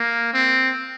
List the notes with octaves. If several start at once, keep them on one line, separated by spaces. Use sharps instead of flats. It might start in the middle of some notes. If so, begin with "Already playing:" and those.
Already playing: A#3
C4